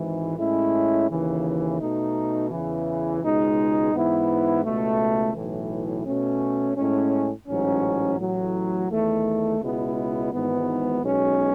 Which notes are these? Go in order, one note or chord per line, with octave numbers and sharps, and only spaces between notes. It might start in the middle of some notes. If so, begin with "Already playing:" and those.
Already playing: G#1 G#2 E3
A2 G#3 C#4 E4
D#2 C#3 E3
B2 A3 D#4
E2 C#3 E3
C#2 B2 G#3 D#4
G#2 E3 B3 E4
C#2 B2 A3
B1 A2 E3
B2 A3 C#4
A2 G#3 C#4
A1 G#2 F#3 C#4
A1 A2 F#3
E2 D#3 A3
C#2 B2 G#3 B3 E4
G#1 G#2 E3 B3
B1 B2 G#3 C#4